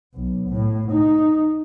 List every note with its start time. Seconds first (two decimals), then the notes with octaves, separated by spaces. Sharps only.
0.14 B1
0.50 A2
0.91 D#4